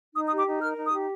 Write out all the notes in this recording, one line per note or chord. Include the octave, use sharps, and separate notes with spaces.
D#4 D#6
D#6
G4
D6
D#4
A#4 F6
D#4
D#6
G4